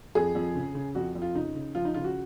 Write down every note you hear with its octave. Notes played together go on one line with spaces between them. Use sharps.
F2 G#4
F2
C#3
C#3
F2 F#4
F2
F4
C#3 D#4
C#3
F3 F4
D#4
C#3 F4
F#4